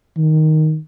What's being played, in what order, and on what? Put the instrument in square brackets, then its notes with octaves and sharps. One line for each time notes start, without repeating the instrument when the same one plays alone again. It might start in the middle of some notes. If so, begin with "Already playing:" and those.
[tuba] D#3